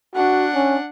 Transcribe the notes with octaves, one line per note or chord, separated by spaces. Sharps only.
D4 F#4 F#5
C#4